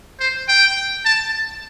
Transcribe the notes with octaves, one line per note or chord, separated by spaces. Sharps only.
C5
G5
A5